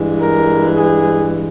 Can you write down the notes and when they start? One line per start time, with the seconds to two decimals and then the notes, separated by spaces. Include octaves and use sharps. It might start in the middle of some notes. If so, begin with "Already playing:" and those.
Already playing: G2 E3 G#3
0.21 A#4
0.75 G#4